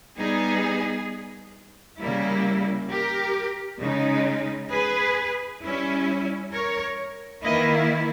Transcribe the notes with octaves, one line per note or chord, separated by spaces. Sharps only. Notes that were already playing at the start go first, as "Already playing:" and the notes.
G3 B3 D#4 G#4
C#3 G3 A#3 E4
G4 A#4
C#3 G#3 D#4
G#4 B4
G3 C#4 E4
A#4 C#5
D#3 A#3 E4 B4 D#5